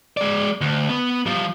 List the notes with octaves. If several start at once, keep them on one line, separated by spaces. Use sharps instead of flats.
G#3 D5
D2
B3
F3 G3